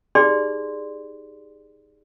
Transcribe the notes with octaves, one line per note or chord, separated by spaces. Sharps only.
D#4 G4 G#4 D5 C6